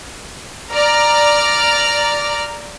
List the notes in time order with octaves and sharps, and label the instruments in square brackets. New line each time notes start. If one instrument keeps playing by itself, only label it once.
[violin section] D5 A#5 F6